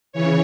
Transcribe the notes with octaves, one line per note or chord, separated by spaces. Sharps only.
C#3 E3 C#5